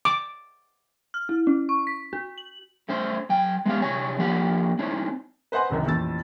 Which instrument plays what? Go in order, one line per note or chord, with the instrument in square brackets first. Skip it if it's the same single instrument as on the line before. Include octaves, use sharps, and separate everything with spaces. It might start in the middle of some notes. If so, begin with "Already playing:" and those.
[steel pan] D6
[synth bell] F6
E4
C#4
C#6
B6
F#4
F#7
[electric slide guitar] A3 C#4 C5
F#2 G5
G#3 B3 G4 F5
C3 F#4 C#5 G#5
F3 A#3 G4 F#5
C4 C#4 D#4 E4
[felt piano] B4 C5 D#5 F#5 G#5 C6
F#1 C2 F#2 D#3
A1 F2 A#2 E6 A6